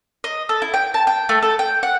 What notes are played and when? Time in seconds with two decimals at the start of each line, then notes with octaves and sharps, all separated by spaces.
0.24 D#5
0.49 A4
0.62 E4
0.74 G5
0.94 A5
1.07 G5
1.29 A3
1.43 A4
1.59 G5
1.83 F#5